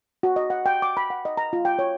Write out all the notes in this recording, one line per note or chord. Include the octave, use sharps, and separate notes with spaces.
F#4
D#5
F#5
G5
D6
B5
F#5
D#5
A#5
F4
G5
C#5